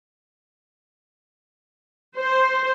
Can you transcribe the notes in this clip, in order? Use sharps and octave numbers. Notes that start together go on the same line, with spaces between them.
C5